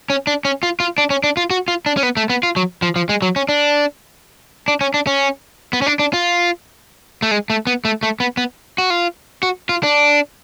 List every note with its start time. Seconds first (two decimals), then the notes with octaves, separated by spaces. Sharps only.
0.10 C#4
0.27 D4
0.45 C#4
0.63 F4
0.80 F4
0.98 D4
1.10 C#4
1.24 D4
1.37 F4
1.50 F#4
1.68 F4
1.86 D4
1.97 C#4
2.03 B3
2.17 A3
2.30 B3
2.43 F4
2.56 F#3
2.82 F3
2.96 F3
3.09 G#3
3.22 F#3
3.36 C#4
3.49 D4
4.68 D4
4.81 C#4
4.94 D4
5.07 C#4
5.73 B3
5.82 C#4
5.86 D4
5.99 D4
6.13 F4
7.22 A3
7.31 G#3
7.50 A3
7.67 B3
7.85 A3
8.03 A3
8.20 B3
8.37 B3
8.78 F#4
8.90 F4
9.43 F#4
9.69 F4
9.83 D4